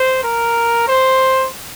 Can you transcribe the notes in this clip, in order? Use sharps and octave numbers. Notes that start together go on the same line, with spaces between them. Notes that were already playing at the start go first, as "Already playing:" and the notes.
Already playing: C5
A#4
C5